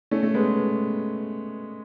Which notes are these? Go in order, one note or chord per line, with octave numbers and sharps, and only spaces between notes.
A3 C#4
A3
G#3 B3